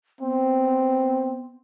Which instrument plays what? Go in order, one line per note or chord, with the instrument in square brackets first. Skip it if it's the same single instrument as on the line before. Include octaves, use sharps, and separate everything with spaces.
[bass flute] B3 [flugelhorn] C4